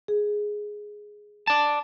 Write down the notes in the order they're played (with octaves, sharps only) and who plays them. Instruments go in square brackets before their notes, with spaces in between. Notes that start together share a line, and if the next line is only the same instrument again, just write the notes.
[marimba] G#4
[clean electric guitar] D5 A5